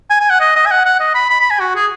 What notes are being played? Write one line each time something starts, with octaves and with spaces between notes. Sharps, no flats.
G#5
G#5
F#5
D#5
D#5
G#5
F#5
F#5
D#5
B5
B5
B5
G#5
F#4
G#4